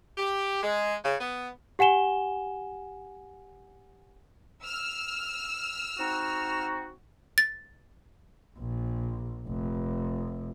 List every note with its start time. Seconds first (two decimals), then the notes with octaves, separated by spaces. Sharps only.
0.17 G4
0.63 G#3
1.05 C#3
1.21 B3
1.79 G4 F#5 G#5 E7 G7
4.63 E6 F6
5.98 C4 D#4 F#4
7.38 A6
8.58 A#1
9.47 F1